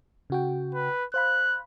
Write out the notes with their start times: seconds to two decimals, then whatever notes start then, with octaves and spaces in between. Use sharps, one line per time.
0.30 C#3 F#4 G5
0.75 B4
1.14 C5 F5 B5 F#6